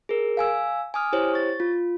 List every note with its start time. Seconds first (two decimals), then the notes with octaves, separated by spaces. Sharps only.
0.09 G#4 A#4
0.37 F5 G#5 E6
0.94 G#5 D6 D#6 F6
1.12 E4 G4 C5 C#5
1.34 C#6 A6
1.60 F4